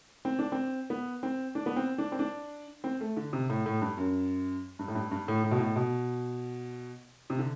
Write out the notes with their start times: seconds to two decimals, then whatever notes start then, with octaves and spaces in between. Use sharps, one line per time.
0.25 C4
0.39 D4
0.52 C4
0.90 B3
1.23 C4
1.55 D4
1.66 B3
1.76 C4
1.98 D4
2.12 C4
2.19 D4
2.84 C4
3.01 A3
3.17 D3
3.33 C3
3.50 A2
3.66 A2
3.82 G2
3.97 F#2
4.79 G2
4.88 A2
4.95 G2
5.12 G2
5.28 A2
5.44 A2
5.51 B2
5.59 A2
5.76 B2
7.30 C3
7.38 D3